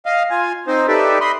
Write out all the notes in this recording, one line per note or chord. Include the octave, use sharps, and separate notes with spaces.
D#5 F5
F4 G#5
C4 D#4 C5
D#4 G4 A4 B4 D5 E5
D#5 B5 C6